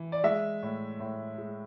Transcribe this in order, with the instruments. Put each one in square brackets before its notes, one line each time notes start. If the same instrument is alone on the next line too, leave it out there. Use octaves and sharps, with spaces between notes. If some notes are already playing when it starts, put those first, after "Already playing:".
Already playing: [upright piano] E3
D5
G#3 E5
A2
A2
G#3